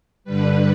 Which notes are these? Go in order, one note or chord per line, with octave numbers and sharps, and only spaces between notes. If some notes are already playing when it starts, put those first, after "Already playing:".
G2 D3 G3 B4